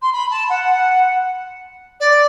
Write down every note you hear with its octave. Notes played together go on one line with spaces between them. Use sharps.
C6
B5
A5
F#5
D5